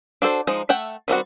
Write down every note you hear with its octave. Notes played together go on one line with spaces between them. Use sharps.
D4 F#4 A4 C5
F3 G#3 D#4
A3 E5 F#5 G5
D#3 G3 C4 F#4